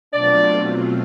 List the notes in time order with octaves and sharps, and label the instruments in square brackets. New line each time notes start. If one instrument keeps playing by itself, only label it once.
[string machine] B2 F#3 A3 C4 F4 [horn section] D4 D5